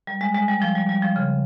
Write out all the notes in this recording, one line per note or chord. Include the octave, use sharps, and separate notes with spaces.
G3
G#3
G#3
G3
F3
G3
G3
F3
C#3